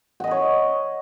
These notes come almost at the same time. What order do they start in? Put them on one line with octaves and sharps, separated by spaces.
F#5 D#5 B5 C#5